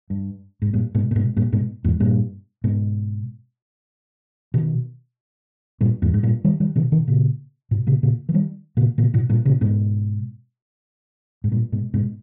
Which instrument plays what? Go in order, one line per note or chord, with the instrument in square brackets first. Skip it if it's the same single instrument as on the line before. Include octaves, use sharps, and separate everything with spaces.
[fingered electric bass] G2
G#2
G2 A#2
G#2 B2
A#2
G#2 B2
G2 A#2
G#2 B2
E2 G#2
G2 A#2
G#2 B2
B2 D#3
G2 A#2
E2 G#2
G#2
G2 A#2
D#3 G3
D#3 G3
B2 D#3
B2 D#3
A#2 C#3
G#2 B2
A#2 C#3
A#2 C#3
E3
D#3 G3
A#2 C#3
A#2 C#3
G#2 B2
G2 A#2
A#2 C#3
G#2 B2
G#2
G2 A#2
G#2 B2
G#2 B2